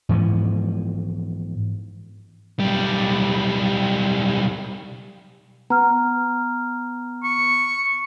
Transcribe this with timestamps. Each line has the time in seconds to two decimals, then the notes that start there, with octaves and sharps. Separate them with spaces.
0.09 G#2 E3 F3 B3
2.60 B1 G3
5.70 B3 A#5 F6
7.24 C#6